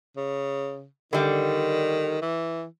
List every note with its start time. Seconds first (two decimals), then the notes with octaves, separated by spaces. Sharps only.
0.17 C#3
1.13 D3 D#3 G3
2.22 E3